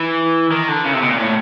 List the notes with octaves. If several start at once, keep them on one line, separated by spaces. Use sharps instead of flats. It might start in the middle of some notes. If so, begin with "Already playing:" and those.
Already playing: E3
D#3
D3
C#3
C3
B2
A#2
A2